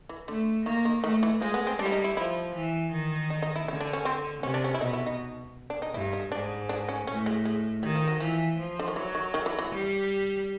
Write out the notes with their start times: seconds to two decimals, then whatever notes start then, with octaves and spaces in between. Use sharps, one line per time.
0.09 E3
0.28 D3 A3
0.66 D#3 A#3
0.85 D#3
1.04 D#3 A3
1.23 E3
1.41 F3 G#3
1.54 B3
1.67 C4
1.79 G3 D4
1.86 E4
1.92 D#4
2.04 E4
2.17 F3 E4
2.55 E3
2.92 D#3
3.30 D#4
3.42 D#4
3.56 E4
3.68 D3 E4
3.81 D4
3.93 C#4
4.05 C4
4.43 C3 C#4
4.54 D4
4.64 C#4
4.74 E4
4.81 B2 D#4
4.93 E4
5.06 D#4
5.70 D4
5.82 D#4
5.94 G2 E4
6.13 D#4
6.32 G#2 D4
6.69 D4
6.89 C#4
7.07 A2 C#4
7.26 G#3
7.45 G#3
7.83 D#3 G3
7.95 F3
8.08 F#3
8.20 E3 F3
8.59 F3
8.79 D3
8.88 D#3
8.96 E3 F#3
9.15 D#3
9.34 D#3
9.46 E3
9.59 E3
9.71 G3